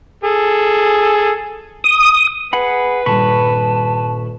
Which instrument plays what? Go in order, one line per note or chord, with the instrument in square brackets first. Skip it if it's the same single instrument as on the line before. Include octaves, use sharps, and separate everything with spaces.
[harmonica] G#4 A4
[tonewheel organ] D#6
[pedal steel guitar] G#4 F#5 B5 [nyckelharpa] B4
[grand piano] D#1 G2 [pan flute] A5 [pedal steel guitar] B5 C#6